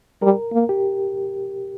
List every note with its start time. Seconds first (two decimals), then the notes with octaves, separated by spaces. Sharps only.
0.22 G3 A#4
0.53 A#3
0.69 G4